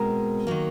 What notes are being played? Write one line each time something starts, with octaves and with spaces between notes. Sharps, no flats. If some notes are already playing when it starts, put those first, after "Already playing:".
Already playing: B2 G#3 C4 A#4
D#3 F#3 A#3